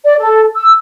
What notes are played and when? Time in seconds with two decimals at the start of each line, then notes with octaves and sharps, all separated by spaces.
0.05 D5
0.19 A4
0.55 E6